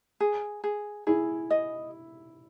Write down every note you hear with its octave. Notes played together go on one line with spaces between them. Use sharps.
G#4
G#4
E4 G#4
D#5